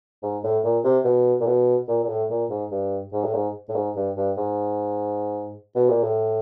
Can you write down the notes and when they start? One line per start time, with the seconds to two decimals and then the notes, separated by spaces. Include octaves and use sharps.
0.23 G#2
0.43 A2
0.64 A#2
0.84 C3
1.05 B2
1.40 A#2
1.46 B2
1.88 A#2
2.03 A#2
2.09 A2
2.30 A#2
2.50 G#2
2.71 G2
3.13 G#2
3.24 A2
3.35 G#2
3.69 A2
3.75 G#2
3.96 G2
4.17 G2
4.37 G#2
5.75 B2
5.89 A#2
6.03 A2